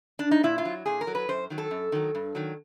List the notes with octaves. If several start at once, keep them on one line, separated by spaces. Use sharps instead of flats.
D4
D#4
A#2 E4
F4
F#3
A#2 G#4
A#4
F#3
B4
F#2 C5
D#3 F#3
A4
F#2
D#3 F#3
G2
D#3 F#3